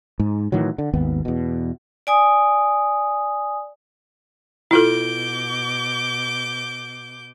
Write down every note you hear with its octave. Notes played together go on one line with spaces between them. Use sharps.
G#2
A2 D#3 E3 F#3
D3
G#1 D#2 B3
E2 B2
D5 G#5 D#6
B2 E4 F4 A4 D6 G6